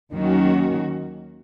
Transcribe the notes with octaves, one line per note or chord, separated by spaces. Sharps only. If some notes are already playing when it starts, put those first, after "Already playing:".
D#2 D#3 F#3 C#4 F#4